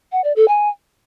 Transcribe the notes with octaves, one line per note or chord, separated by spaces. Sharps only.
F#5
D5
A4
G#5